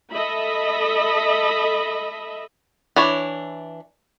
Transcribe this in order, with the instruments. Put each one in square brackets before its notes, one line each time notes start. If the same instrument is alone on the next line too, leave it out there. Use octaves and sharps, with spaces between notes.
[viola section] A4 D#5 E5 B5
[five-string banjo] E3 D4 C#5